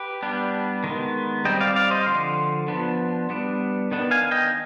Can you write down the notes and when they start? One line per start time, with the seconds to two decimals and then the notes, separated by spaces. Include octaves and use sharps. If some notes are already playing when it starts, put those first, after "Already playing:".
Already playing: G4 B4
0.23 G3 B3 D4
0.84 D#3 G#3 B3
1.45 G3 C4 D#5 G5
1.60 D5 F5
1.76 D5 F5
1.91 C5 D#5
2.06 D3 F3 C6
2.68 F3 B3 D4
3.30 G3 B3 D4
3.91 D#3 B3 D4
4.11 F5 G#5
4.31 D#5 G5